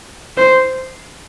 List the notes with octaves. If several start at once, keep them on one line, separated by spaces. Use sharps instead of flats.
C5